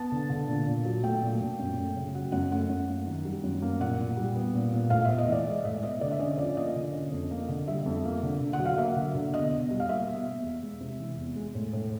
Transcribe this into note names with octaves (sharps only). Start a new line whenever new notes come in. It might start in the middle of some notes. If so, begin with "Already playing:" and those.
Already playing: B3 A5
D3
D3
A#2
A#2
F#3
A3 G5
A#2
A#2
F#2
A3
C#3
F#3 F#5
F#2 F#5
A3 F#5
F#2
A#3
D#3
G3
F#2
A#3
A#2 F#5
A#2
G3
B3
A#2
A#2
A2 F5
B3 E5
D#5
E3 D5
G#3 D#5
A2 E5
B3 D#5
D3 D5
E5
C#4 D#5
F3 D5
A#3 D#5
D3
C#4
F2
A#3
D3
G3 E5
F2
A#3
D3
D3
F#5
F#3
F5
A#3 E5
D3
D3
B2 D#5
B2
G3
F5
A#3 E5
B2
B2
E2
G#3
C3
E3
E2
G#3
A2
A2